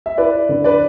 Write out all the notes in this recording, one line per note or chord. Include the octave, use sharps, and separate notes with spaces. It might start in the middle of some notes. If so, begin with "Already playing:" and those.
E5
E4 B4 D5
D3
B4 D5